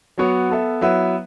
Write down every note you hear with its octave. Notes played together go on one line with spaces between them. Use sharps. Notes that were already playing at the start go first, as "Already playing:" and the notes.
F#3 B3 F#4 C#5
B3 A4 E5
F#3 B3 E4 B4 E5